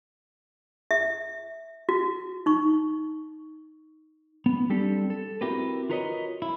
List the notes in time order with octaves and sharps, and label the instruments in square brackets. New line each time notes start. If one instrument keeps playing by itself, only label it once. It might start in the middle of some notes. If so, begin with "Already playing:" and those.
[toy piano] E5
F#4
D#4 C#6
[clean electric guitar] B3
G3 C4 D4 G4 A4
A4
C4 E4 F#4 G4 A#4 B4
F4 F#4 A#4 B4 C#5 D#5
E4